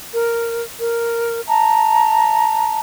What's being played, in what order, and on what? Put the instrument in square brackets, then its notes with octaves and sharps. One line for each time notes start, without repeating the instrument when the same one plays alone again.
[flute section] A#4
A#4
E5 A5 A#5